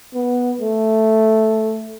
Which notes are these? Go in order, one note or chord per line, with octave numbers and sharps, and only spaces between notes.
B3
A3